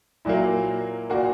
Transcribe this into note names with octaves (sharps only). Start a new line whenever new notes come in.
A#2 F#3 A#3 E4
A#2 A#3 F#4